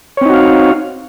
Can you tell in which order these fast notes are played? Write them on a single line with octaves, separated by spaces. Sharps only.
C#5 C4 D#4 F#4 F5